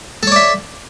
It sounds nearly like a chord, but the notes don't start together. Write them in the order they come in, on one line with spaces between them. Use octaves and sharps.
A4 C#5 D5 E5